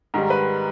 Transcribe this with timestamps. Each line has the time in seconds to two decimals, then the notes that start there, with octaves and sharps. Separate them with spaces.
0.14 G#2 D#3 G3 A#4
0.30 B4